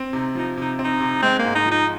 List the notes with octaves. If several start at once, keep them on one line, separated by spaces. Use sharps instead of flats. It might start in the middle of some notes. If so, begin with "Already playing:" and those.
Already playing: C4
C3 D#4
F3 D#4
C3 D#4
C4
D#4
C3
G#3 C4
A#3
G#2
D#4
F3
D#4